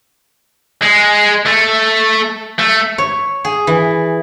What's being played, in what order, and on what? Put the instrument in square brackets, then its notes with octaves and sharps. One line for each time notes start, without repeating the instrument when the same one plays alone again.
[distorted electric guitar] G#3
A3
A3
[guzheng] C#5
G#4
E3